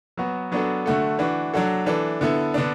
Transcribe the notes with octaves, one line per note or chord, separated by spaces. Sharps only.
F#3 B3 F#4
F#3 B3 D4 F#4 A4
D3 A3 F#4 A4
E3 D4 F#4
F#3 D4 F#4 A4
E3 D4 A4
D3 B3 E4 A4
D3 B3 D4